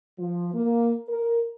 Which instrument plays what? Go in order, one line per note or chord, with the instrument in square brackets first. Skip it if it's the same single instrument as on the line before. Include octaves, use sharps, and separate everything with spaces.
[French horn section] F3
A#3
A#4